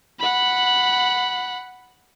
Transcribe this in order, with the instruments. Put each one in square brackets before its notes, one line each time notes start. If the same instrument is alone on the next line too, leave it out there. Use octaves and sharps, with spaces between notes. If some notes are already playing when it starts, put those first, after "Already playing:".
[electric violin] F#5 B5